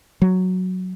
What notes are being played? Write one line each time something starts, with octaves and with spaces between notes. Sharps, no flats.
F#3